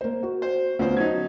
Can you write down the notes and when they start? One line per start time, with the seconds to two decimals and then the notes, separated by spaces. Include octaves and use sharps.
0.01 A#3 C5
0.23 F#4
0.42 C5
0.79 D2 B3 C#4 F4 C5
0.97 F#3 C#4 D#4 G#6